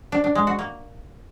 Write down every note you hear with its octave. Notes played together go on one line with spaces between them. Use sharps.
D4
D4
G#3
F#4
A#3